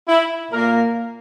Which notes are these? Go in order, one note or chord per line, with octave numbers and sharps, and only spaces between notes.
E4
A#2 A#3 A#4